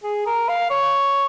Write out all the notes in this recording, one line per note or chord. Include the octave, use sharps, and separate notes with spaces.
G#4
A#4
F5
C#5